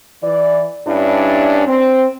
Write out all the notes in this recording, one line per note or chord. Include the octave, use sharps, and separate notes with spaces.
E3 D5
G2 C#4 D4 E4
C4